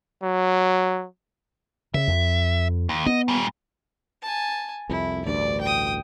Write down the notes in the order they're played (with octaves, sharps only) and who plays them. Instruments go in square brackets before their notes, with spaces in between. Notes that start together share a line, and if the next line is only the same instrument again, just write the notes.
[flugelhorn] F#3
[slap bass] C#3 [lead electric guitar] E5
[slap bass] F2
[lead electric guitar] D#2
[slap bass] B3 [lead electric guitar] D#5
[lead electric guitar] A#2 G3
[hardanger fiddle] G#5 A5
[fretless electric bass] C2 F2 [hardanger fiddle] E4
[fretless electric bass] A1 D2 G2 [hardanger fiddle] D5
[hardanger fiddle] G5 D#6